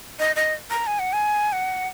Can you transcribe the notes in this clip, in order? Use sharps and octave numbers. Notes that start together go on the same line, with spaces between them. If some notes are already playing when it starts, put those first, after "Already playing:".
D#5
D#5
A#5
G#5
F#5
G#5
F#5